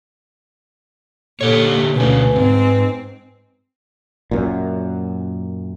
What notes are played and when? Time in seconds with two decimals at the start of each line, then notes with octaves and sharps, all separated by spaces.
1.41 A#2 D3 G4 A4 C#5 D6
1.96 D2 B2 C#4 B4 G#5
2.36 G#2 C4
4.31 F#2 A#2